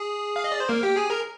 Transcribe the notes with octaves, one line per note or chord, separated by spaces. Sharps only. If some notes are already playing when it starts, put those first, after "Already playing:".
Already playing: G#4
F5
D#5
D5
C5
A#3 A#4
G4 G5
G#4 G#5
A#4 A#5